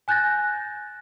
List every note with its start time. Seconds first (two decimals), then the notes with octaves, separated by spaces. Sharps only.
0.08 G#5 F#6 G6 A6 A#6